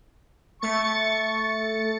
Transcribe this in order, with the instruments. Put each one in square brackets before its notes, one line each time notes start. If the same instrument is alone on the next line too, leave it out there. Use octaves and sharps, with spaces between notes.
[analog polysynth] A3 A6 C#7 [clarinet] C#6